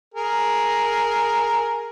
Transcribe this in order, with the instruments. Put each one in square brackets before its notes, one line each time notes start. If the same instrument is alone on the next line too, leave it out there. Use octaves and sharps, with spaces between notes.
[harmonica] G#4 A#4